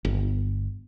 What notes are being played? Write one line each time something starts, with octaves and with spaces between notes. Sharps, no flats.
G1